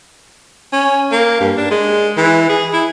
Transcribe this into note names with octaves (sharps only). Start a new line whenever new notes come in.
C#4
A#3
G2
D4
G#3
E3
G#4
E4